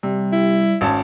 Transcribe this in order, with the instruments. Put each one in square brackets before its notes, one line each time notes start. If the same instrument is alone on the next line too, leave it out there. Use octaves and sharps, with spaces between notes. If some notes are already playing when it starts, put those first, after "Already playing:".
[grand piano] C3 [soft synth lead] G3
[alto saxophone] E4
[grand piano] G#1 C#4 A5